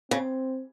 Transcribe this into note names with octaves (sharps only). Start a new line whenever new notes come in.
C#3 C4